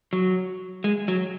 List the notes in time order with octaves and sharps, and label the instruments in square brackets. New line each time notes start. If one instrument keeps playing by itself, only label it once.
[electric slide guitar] F#3
G#3
F#3